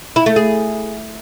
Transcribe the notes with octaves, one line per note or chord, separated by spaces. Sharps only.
E4
A3
G#4